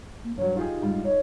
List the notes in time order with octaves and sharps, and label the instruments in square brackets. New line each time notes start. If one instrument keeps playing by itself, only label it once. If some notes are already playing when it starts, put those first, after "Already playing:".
[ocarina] A#3
[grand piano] G2 F#3 [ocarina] C#5
[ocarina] D#4 [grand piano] F4 G4 G#4
[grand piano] G#2 G3 F4
[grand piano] D#4 [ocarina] C#5